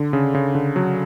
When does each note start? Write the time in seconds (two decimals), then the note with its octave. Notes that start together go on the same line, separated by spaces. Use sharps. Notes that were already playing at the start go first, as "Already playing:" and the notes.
Already playing: D3
0.13 C#3
0.35 C#3
0.55 D3
0.76 F#3